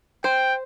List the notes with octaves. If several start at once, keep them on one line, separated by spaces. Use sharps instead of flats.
C5 G5